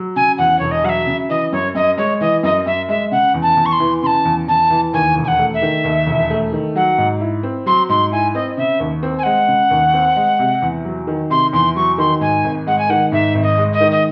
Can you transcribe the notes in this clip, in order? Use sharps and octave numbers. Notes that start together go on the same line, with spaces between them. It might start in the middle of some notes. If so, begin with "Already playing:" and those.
Already playing: F#3
C#3 G#5
E2 F#5
E1 C#5
D#5
F#3 E5 F#5
C#3
E3 D#5
F#2 C#5
F#2 D#5
G#3 C#5
E3 D#5
F#2 D#5
F#2 E5
G#3 E5
C#3 F#5
E2
A5
E2
C#6
C6
E3
C#3 A5 C6
E2
E2 A5
E3
D#2 G#5
E1
G#5
F#5
A3
E5
D#3
D#2
E1
A3
D#3
F#3 F#5
G#2
E4
C4
F#3 C6
G#2 C6
E4 G#5
C4 D#5
C#3 E5
D#2
C4
G#5
G#3 F#5
C#3
D#2
C4
G#3
C3
E2
F#3
D#3
C3 C6
E2 C6
F#3 C#6
D#3 C6
G#2 G#5
G#1
G#3 F#5
G#5
D#3 F#5
G#2 E5
G#1
D#5
G#3
D#5
D#3
D#5